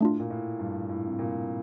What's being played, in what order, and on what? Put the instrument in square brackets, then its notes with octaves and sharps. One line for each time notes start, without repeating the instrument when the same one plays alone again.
[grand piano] A2 [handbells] A3 D4 F4
[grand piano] A#2
A2
G2
A2
C3
A#2